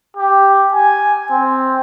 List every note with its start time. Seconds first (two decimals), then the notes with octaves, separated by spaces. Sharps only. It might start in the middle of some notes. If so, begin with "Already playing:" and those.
0.17 G4
0.74 G#5
1.31 C4